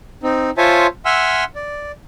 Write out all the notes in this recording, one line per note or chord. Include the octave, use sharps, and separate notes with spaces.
C4 D#4
F4 C5 C#5 E5 G#5 A5
E5 F#5 G#5 C6 E6 F6
D5